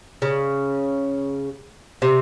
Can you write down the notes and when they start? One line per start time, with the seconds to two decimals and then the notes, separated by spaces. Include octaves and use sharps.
0.22 C#3
2.02 C3